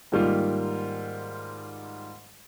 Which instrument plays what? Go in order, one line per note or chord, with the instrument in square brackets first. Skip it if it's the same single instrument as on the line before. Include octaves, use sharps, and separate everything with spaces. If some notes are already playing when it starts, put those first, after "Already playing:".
[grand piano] G#2 D#3 G3 A#3 F4